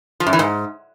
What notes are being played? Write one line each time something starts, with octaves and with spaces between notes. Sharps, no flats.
F3
F#2
E3
G#2